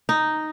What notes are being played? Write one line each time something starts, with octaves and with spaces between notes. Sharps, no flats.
D#4